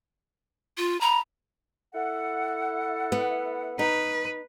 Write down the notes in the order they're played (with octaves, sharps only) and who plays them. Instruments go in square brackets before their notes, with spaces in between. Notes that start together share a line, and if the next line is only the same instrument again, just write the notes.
[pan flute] F4
[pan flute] A#5 [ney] B5
[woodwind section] E4 A4 F#5
[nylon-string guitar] B3
[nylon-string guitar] D#4 [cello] B4